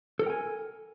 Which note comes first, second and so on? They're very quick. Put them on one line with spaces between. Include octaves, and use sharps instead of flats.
A4 A#4 G5 G#5